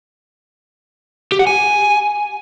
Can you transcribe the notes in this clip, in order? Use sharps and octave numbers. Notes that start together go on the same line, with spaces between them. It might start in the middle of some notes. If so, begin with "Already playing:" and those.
G4
F#5
G#5